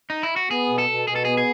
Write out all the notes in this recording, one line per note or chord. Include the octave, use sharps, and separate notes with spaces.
D#4
E4
F#4
B3 G#4
B2
A4
B2
B2 G#4
A4
B3 G#4
G#4